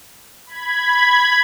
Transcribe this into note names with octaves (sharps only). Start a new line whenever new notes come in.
B5 G#6